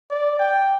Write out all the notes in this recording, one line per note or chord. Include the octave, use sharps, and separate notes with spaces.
D5
G5